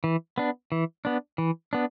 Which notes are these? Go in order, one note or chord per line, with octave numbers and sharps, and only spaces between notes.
E3
B3 D4
E3
B3 D4
E3
B3 D4